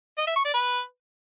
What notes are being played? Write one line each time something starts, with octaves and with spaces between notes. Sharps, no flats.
D#5
E5
C#6
D5
B4